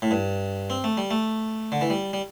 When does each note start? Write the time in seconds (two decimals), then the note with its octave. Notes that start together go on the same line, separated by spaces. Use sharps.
0.02 A2
0.11 G2
0.70 C4
0.84 A3
0.97 G3
1.11 A3
1.72 D3
1.81 E3
1.90 G3
2.13 G3